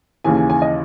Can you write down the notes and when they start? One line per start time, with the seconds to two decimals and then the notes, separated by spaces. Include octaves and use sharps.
0.24 D#2 C#3 E3 G#5
0.37 G#5
0.50 G#5
0.62 D#5